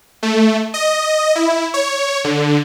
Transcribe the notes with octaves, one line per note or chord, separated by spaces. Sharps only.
A3
D#5
E4
C#5
D3